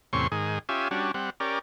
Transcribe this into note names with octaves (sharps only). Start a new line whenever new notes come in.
E2 A2 C3 C#4 C6 C#6
G#2 D#3 G#4
C#4 F4 G4 E5 G#5
G3 C#4 D4 F#4
G3 C4 F#5
C#4 G4 A#4 D5